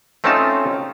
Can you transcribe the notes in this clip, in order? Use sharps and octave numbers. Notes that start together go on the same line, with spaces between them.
A3 C4 C#4 D#4 F4 A5